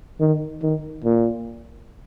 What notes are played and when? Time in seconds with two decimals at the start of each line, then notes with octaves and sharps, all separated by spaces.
0.20 D#3
0.62 D#3
1.04 A#2